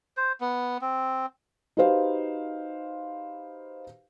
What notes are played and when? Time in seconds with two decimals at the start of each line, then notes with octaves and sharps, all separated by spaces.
0.17 C5
0.41 B3
0.81 C4
1.77 D#4 F#4 G4 B4 C5 F5